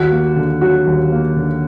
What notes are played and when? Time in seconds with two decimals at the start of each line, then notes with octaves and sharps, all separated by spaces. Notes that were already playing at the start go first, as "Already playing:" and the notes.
Already playing: D#2 F#4
0.12 A#3
0.36 D3
0.61 F#3 F#4
0.87 D#2
1.12 A#3
1.37 D3